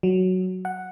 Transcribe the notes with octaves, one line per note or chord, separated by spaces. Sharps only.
F#3
F#5